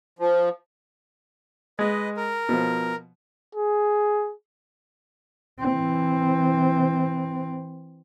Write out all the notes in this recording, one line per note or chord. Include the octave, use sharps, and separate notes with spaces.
F3
G#3 B4 D#5
A#4
B2 F3
G#4
E3 C4